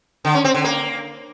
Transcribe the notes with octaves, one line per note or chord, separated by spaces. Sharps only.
D3
C#4
C4
D3
A#3